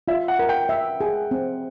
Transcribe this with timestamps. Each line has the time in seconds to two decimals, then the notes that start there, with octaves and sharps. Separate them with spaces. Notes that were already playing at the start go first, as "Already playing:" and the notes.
0.08 F4 E5
0.28 F#5
0.39 A#4
0.49 G5
0.69 E5
1.01 G#4
1.31 C4